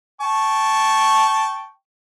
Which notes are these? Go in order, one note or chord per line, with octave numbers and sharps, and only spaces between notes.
G5 A5 C#6